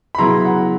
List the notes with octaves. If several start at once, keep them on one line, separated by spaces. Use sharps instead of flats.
B5
C#3 F#3 B3 E4 A#5 C6
F#5